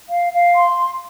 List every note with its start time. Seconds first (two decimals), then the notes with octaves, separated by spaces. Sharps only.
0.09 F5
0.33 F5
0.56 C6